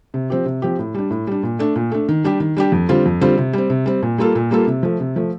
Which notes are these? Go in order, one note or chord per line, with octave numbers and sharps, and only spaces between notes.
C3
F3 C4 G4
C3
F3 C4 G4
A2
G3 D4
A2
G3 D4
A#2
A3 D4
A#2
A3 D4
D#3
G3 D4 G4
D#3
G3 D4 G4
F2
D3 G3 C4 F4
F2
D3 G3 C4 F4
C3
G3 C4
C3
G3 C4
A#2
G3 A#3 F4 A4
A#2
G3 A#3 F4 A4
C3
F3 A3
C3
F3 A3